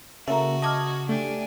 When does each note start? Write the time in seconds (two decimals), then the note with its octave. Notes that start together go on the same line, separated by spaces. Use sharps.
0.28 C#3 A#3 F#4 A4 E5 A#5
0.62 D#5 A5 D6 F6 G#6
1.09 A3 D4 G4 G#5